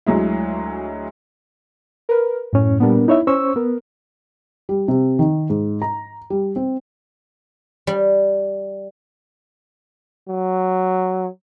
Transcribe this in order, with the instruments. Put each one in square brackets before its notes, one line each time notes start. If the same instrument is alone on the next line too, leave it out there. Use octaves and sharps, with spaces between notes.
[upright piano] D2 F#3 G#3 E4
[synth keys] A#4 B4
[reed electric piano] F#2 C#4 [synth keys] A2
[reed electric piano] A#2 G3 [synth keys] B3 D4 A#4
[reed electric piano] D#4 C#5 E5 [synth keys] E4
[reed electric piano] C#4 C5 C#6 [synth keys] E6
[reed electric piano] B3 [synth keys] A#4
[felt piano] G3
C3
D#3
G#2
A#5
G3
C4
[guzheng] G3
[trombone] F#3